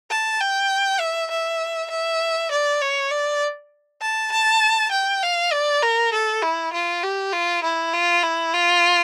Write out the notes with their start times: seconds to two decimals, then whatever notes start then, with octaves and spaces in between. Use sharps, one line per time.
0.10 A5
0.41 G5
1.00 E5
1.31 E5
1.90 E5
2.51 D5
2.82 C#5
3.11 D5
4.01 A5
4.32 A5
4.92 G5
5.23 F5
5.52 D5
5.83 A#4
6.13 A4
6.43 E4
6.73 F4
7.03 G4
7.33 F4
7.64 E4
7.94 F4
8.23 E4
8.53 F4